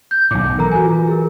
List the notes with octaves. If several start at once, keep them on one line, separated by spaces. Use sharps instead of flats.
G6
B1 A2 D6
E3 A4 A#4 A#5
F#4 A4 G#5
F4
G#4 A#4